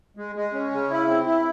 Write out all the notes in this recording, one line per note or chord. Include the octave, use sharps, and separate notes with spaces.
G#3
G#3
C#4
C#3
E4
C4
E4